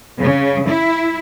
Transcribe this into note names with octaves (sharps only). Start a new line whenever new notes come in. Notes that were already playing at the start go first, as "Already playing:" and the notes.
C#3
E4